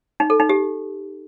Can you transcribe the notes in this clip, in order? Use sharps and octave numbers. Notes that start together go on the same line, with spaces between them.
D#4
A4
D#4
G4